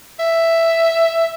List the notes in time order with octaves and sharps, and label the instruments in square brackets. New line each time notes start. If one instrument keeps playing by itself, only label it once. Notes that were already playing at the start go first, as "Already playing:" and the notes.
[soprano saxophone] E5